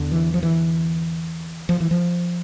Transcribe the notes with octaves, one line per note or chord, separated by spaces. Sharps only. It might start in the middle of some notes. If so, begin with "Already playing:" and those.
Already playing: E2 D3
E3
F3
E3
F3
E3
F3